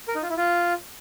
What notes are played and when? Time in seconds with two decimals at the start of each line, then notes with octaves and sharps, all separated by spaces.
0.08 A#4
0.15 D#4
0.23 F4
0.30 E4
0.37 F4